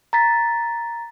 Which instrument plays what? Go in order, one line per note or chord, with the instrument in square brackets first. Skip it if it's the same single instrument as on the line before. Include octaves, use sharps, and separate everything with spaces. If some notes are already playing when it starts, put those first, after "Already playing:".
[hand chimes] A#5 A6 B6